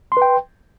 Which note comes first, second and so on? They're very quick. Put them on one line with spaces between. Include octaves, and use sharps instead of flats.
C6 B4 G5